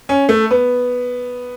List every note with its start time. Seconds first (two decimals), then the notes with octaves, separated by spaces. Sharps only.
0.09 C#4
0.29 A3
0.51 B3